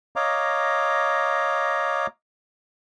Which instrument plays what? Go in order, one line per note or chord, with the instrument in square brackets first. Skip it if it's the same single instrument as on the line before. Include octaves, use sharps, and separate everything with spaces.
[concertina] C#5 D#5 F5 A#5 D6